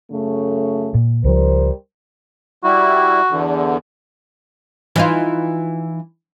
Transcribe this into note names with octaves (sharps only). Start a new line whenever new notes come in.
F#2 C#3 A3
A#2
C#2 F3 G3 A#4 C5
G3 E4 F#4
E2 D3
E3 D#4 F4